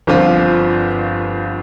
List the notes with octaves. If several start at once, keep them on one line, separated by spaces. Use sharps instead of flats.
G1 G2 F3 C4 F4